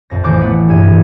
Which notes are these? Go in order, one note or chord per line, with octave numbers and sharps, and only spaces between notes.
A#1 F2 A#6
A1 F3 C5 D6 F#6 A#6
A3 B3 B4
E1 G2 E5 G#6 D#7
A1